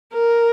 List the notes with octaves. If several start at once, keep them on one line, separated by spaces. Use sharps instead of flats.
A#4